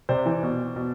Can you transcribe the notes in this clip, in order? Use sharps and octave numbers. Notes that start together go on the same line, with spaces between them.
C3 C5 D5
E3
B2
B2